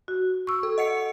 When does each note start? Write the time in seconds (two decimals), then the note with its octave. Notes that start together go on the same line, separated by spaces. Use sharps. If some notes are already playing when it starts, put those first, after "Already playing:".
0.08 F#4
0.47 C#6 E6
0.63 A4
0.78 D#5 F#5 C#7